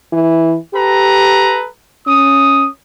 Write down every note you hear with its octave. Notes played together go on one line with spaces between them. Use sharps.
E3
G4 A4 B4 A#5
C#4 D#6